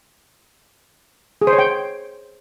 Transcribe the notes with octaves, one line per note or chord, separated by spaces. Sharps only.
G#4
C5
C#5
G5